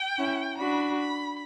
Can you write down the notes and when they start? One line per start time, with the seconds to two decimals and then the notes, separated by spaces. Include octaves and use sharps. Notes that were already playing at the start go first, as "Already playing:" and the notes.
Already playing: G5
0.18 C#4 E4
0.58 D4 F#4 B5
0.99 B5